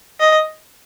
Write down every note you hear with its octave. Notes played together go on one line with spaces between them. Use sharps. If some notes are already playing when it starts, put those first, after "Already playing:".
D#5